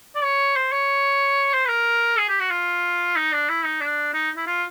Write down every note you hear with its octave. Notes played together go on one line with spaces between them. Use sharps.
D5
C#5
C5
C#5
C5
B4
A#4
G#4
G4
F#4
F4
D#4
D4
E4
D#4
D4
D#4
E4
F4